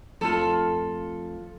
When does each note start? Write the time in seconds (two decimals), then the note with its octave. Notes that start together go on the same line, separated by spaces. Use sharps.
0.21 F2 A3 F4 A4